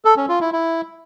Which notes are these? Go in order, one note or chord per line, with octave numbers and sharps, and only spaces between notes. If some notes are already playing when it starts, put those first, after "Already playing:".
A4
C#4
F4
E4
E4